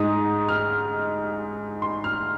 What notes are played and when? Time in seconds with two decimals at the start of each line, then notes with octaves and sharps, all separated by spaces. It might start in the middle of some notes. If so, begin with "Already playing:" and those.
Already playing: G#2 G#3 D#4 D#6
0.49 F6
1.82 C6
2.04 F6